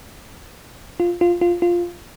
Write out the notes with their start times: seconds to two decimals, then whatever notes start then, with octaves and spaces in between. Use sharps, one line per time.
1.00 F4
1.21 F4
1.41 F4
1.62 F4